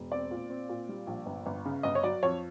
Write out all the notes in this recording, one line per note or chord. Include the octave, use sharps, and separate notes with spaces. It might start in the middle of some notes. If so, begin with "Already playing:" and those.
Already playing: E1
C4 D5
A#2
C4
A#2
G3
A#1
G1
G1
C#3
G1 D#5
C#5
F#3 D5
F2 C#5